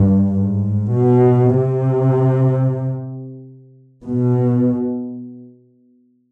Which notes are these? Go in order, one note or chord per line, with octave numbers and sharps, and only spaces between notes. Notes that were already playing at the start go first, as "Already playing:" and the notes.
Already playing: G2
G#2
B2
C3
B2